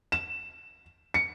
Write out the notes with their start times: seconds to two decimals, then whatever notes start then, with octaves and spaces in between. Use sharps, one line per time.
0.12 E7
1.14 C#7